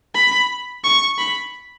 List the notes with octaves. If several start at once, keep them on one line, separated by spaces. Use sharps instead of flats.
B5
C#6
B5